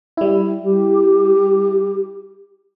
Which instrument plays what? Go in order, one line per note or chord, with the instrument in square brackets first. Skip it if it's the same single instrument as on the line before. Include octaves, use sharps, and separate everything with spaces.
[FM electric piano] G3 E4
[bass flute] G4